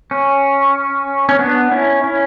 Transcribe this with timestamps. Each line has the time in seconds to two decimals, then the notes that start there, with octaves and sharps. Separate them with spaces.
0.11 C#4
1.29 C#4
1.39 B3 D4
1.71 C#4 E4
2.04 C#4 E4